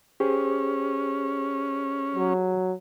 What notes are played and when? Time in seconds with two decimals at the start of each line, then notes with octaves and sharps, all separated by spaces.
0.20 C#4 G4 G#4 C5
2.16 F#3